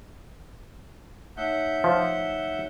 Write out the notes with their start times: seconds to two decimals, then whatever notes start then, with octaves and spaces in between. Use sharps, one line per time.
1.37 A3 D#4 C#5 E5 F#5 G6
1.84 F3